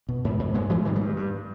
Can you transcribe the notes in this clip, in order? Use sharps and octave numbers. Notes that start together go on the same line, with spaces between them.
B2
G#2
G#2
G#2 G#3 B3
G#2 E3 G#3
G2 D#3 G3
G3 A#3
G2
G2